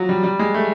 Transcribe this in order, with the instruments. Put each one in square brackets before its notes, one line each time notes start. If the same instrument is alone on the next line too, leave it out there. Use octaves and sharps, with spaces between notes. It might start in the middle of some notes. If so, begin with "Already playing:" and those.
Already playing: [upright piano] F3 F#3
G3
G3
G#3
A3